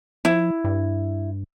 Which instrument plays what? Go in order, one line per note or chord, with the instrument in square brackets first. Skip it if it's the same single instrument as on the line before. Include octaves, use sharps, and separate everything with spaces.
[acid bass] F3 [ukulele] E4
[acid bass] G2